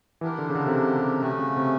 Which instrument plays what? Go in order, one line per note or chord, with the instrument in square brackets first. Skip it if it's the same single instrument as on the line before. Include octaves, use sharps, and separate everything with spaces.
[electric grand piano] E3 [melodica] B3 D4 G4 A#4
[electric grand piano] D3
C#3
D3
C3
C#3
C3
[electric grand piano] C3 [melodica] A3 C#4 F#4
[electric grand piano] C#3
C3